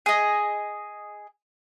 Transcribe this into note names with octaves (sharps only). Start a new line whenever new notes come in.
G#4 D#5